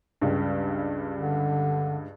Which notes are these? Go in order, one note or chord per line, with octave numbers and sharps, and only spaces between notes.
C#2 G2
D3